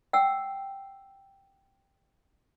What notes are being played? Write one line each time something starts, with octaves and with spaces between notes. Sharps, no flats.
F#5 G5 E6